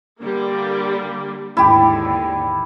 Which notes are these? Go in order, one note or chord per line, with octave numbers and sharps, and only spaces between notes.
D3 G3 A#3
D#2 G#2 D3 E4 G4